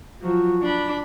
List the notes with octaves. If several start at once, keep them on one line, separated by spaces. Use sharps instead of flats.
F3 F#3
D4 B5